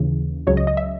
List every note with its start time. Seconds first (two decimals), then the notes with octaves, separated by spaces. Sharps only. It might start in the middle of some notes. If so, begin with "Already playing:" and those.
Already playing: D#2 C#3 E3
0.47 C#2 C#3 F#3 C#5
0.57 D#5
0.67 D#5
0.77 E5